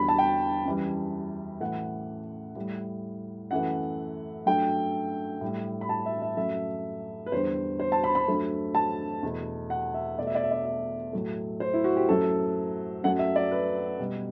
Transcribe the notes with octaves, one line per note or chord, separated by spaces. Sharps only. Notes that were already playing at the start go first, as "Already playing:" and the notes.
Already playing: E2 D3 G3 B5
A5
G5
F#2 E3 G3
A2 E3 A3 F#5
A2 G3
F#2 E3 A3 F#5
G2 F#3 A3 G5
A2 G3
B5
A5
E5
E5
F#2 F#3 A3 E5
B4
E2 D3 G3 C5
C5
A5
B5
B5
G2 F#3 A3
A5
E2 B2 A3
F#5
E5
B2 A3 D5 E5
D5
E5
D5
E5
A2 F#3 A3
C5
E4
F#4
G4
F#2 F#3 A3 A4
F#2 F#3 A3 F#5
E5
D5
B4
B2 G3